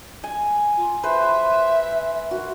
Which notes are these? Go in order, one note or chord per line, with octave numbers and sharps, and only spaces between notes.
G#5
F4
B4 C5 E5
F#4 A#4